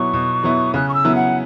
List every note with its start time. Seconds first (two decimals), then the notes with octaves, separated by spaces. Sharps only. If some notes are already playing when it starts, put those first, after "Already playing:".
Already playing: B2 F#3 B3 E4 C#6
0.13 B2
0.43 F#3 B3 E4
0.74 C#3 F#6
0.89 C#6
0.94 E6
1.05 F#3 B3 E4
1.15 F#5